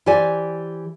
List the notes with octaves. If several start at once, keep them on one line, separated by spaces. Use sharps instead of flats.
E3 G4 C5 D5 G#5